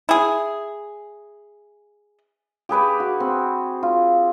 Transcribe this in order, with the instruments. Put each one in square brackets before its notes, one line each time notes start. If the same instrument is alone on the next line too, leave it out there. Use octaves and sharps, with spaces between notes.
[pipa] E4 G#4
[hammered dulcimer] G4 G#4 B4 D6
F#4
C4
F4